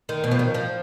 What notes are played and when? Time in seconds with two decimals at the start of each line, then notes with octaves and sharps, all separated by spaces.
0.09 D#3
0.24 B2
0.31 F3
0.39 D#3
0.54 F3